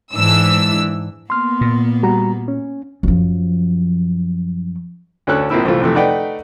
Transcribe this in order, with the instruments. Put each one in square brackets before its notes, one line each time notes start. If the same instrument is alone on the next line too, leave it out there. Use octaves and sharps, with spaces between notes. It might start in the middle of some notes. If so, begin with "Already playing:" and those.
[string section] G#2 E3 D4 E6
[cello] A#3 B3 [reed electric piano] C6 F6
[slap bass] A#2
[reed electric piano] G3 F#4 A#5
C#4
[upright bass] F#2 F3
[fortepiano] D2 D3 C#4 A4 F#6
A#1 F3 A#3 C4 E4 E6
C2 E3 A3 F4 A4
F2 C3 E3 A3
A3 D#4 B4 D5 F#5 G5